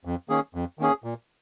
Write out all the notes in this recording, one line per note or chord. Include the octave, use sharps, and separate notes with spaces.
F2
D#3 A#3 C#4 G#4
F2
D#3 A#3 C#4 G#4
A#2